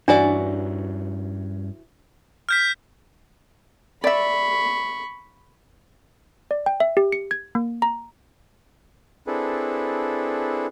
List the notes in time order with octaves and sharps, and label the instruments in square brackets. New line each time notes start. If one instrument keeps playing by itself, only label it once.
[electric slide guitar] G2 C#4 [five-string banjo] E3 F#4 D5 [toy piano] D4
[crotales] F6 G6 B6
[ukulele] D5 E5 [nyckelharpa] B5 C#6
[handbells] D5
G5
E5
G4
C#7
G#6
A#3
A#5
[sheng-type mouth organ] C4 D4 E4 G#4 A4 B4